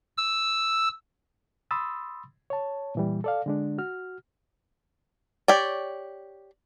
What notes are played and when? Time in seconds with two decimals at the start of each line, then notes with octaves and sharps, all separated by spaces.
0.18 E6
1.71 B5 C6 D#6 E6 A6
2.50 C#5 A5
2.95 A#2 E3 G3
3.24 A4 D5 F5
3.46 D3 G#3 D4
3.78 F#4 F6
5.48 G4 C#5 D5